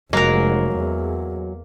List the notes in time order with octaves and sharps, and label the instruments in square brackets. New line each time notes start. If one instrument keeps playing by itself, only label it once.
[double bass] F1 [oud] F#3 G#3 [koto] A#3 A#4
[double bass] E2